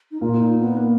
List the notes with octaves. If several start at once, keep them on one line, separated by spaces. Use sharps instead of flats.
D#4
A#2 A#3 F4
D#4
B3
A#3